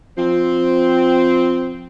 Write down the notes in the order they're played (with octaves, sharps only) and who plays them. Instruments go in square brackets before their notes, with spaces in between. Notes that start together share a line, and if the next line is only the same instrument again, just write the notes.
[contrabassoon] F3 [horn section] C4